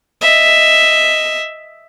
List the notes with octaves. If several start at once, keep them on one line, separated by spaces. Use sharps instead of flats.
D#5 E5